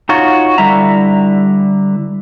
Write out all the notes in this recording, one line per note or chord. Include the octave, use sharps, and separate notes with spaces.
D#4 F4 F#4 C#5
D3 G3 E4 E5 A#5